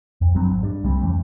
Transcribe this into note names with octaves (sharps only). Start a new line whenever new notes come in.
F2
G1 G2 F#3 C4
G#1
G2
C2 G3 A3 C4
F2 E3 A3 C#4